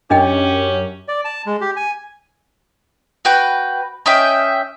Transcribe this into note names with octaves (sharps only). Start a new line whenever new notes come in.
F#2 C#4 D4 G4 D#5 G5
D5
A5
G#3
G4
G#5
F#4 B4 G5
C#4 D#5 E5 G5